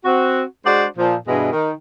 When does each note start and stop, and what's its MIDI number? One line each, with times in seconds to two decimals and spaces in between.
0.04 0.42 60
0.04 0.42 66
0.65 0.84 56
0.65 0.84 62
0.65 0.84 66
0.65 0.84 72
0.65 0.84 74
0.97 1.15 46
0.97 1.15 53
1.27 1.52 43
1.27 1.52 47
1.27 1.52 52
1.27 1.52 56
1.52 1.73 51